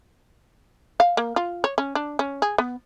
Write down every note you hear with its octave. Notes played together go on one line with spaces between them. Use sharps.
F5
A#3
F4
C#5
C#4
D4
C#4
G#4
B3